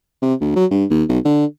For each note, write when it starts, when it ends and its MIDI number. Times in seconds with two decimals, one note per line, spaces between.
0.22 0.34 48
0.41 0.53 38
0.56 0.66 54
0.71 0.85 43
0.90 1.04 39
1.09 1.19 35
1.25 1.45 50